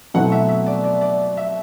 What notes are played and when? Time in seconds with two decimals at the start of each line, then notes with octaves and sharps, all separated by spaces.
0.14 B2 F#3 A3 C4 E4 F#5
0.32 E5
0.49 E5
0.67 D5
0.84 D5
1.01 D5
1.37 E5